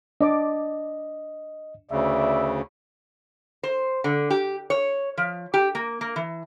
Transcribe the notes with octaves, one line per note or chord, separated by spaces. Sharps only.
D4 D5 D#5 D6
D2 C#3 B4 D5 E5
C5
D3
G4
C#5
F3
G4
A#3
A#3
E3